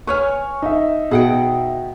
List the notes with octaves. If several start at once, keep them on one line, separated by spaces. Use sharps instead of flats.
B4 C#5 G#5 C#6 F6
D#4 E5
B2 G#4 F#5 G5